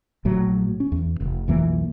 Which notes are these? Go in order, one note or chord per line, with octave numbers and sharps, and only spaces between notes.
A#1 A2 F#3
C#4
E2
F1
B1 F2 E3 A#3